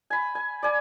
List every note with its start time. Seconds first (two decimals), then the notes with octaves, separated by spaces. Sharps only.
0.10 G#5 B5
0.35 G#5
0.63 D5 G#5